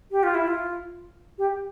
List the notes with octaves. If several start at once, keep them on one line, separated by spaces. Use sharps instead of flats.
G4
F4
E4
F4
G4